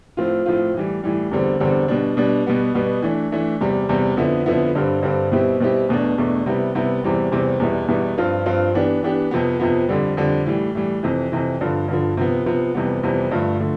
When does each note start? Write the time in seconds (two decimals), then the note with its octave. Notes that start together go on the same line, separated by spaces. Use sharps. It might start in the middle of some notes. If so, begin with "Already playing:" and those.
0.17 A2 F3 C4 F4
0.46 A2 F3 C4 F4
0.74 A2 E3 G3
1.04 A2 E3 G3
1.31 E2 D3 G3 C4
1.60 E2 D3 G3 C4
1.88 B2 G3 D4
2.17 B2 G3 D4
2.47 B2 G3 B3
2.75 B2 G3 B3
3.03 E3 A3 D4
3.32 E3 A3 D4
3.61 E2 C3 G3
3.89 E2 C3 G3
4.17 F2 D3 F3 B3 E4
4.46 F2 D3 F3 B3 E4
4.75 G2 D3 G3 C4
5.03 G2 D3 G3 C4
5.32 B2 G3 C4 E4 G4
5.60 B2 G3 C4 E4 G4
5.89 E2 B2 A3 D4
6.18 E2 B2 A3 D4
6.46 C3 G3 B3 E4
6.75 C3 G3 B3 E4
7.03 E2 C3 E3 G3 C4
7.32 E2 C3 E3 G3 C4
7.60 E2 B2 G3 B3 E4
7.88 E2 B2 G3 B3 E4
8.18 G2 F3 C4 F4
8.46 G2 F3 C4 F4
8.74 E3 B3 D4 G4
9.03 E3 B3 D4 G4
9.31 F2 C3 F3 B3
9.60 F2 C3 F3 B3
9.89 F2 D3 G3
10.17 F2 D3 G3
10.46 A2 E3 G3
10.75 A2 E3 G3
11.03 F2 C3 E3
11.32 F2 C3 E3
11.61 G2 D3 F3
11.88 G2 D3 F3
12.17 C3 F3 B3
12.46 C3 F3 B3
12.75 F2 C3 E3 G3 B3
13.03 F2 C3 E3 G3 B3
13.31 G2 D3 F3 A3
13.60 D3 F3 A3